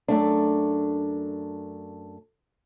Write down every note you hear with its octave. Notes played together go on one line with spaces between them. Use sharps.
F#2 A3 D4